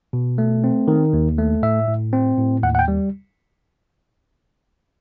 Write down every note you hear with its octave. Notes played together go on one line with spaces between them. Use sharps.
B2
A3
C4
D#3
D#2
A3
A2 E5
A2
C4
A2
D#2 F#5
F#5
G5
G3